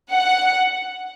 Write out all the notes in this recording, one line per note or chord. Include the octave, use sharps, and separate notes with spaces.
F#5